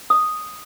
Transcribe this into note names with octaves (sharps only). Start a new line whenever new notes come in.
D#6